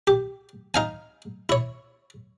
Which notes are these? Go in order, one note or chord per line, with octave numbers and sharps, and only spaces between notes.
G4
D#4 F5 G#5
E4 C#5